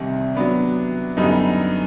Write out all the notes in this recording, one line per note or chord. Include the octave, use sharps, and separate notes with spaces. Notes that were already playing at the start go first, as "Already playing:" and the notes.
Already playing: C2 C3 D#3
F#3 B3 D4
F#2 D3 G3 B3 D#4